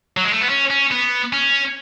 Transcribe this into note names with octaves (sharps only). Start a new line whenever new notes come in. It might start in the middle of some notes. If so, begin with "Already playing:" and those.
F#3
G#3
A3
B3
C#4
C#4
B3
C#4